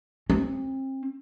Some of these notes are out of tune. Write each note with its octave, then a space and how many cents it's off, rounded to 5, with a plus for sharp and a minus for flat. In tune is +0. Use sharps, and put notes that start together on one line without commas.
C4 +30